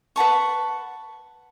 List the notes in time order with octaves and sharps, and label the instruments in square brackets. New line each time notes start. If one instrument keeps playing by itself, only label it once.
[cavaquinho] B4 F#5 A5 C#6